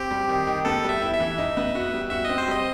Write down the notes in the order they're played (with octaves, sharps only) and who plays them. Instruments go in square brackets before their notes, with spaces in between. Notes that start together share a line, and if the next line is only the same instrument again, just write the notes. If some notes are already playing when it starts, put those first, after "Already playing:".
Already playing: [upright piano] C4 [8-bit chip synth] G4
[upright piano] G3
D#3
D#3
[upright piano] B3 [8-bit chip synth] A4
[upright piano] G3
[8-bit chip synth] E5
[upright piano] E4
[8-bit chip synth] E5
[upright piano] E3
D#4
B3
F#4
G3
[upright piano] F#4 [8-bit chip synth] E5
[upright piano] C4 [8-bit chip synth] D#5
[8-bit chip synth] C5
[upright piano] G3 [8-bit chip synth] D#5